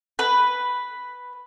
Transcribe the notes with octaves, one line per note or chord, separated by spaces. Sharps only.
B4